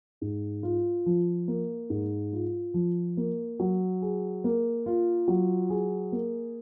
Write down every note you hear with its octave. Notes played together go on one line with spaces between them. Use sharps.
G#2
F4
F3
A#3
G#2
F4
F3
A#3
F#3
G#4
A#3
F4
F#3
G#4
A#3